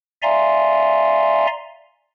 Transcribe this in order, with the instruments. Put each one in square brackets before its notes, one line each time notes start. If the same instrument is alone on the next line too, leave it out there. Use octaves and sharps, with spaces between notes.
[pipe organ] D5 E5 F5 G#5 A#5 C6